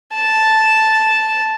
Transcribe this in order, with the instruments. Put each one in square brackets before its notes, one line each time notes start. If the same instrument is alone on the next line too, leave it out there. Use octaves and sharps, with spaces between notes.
[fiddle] A5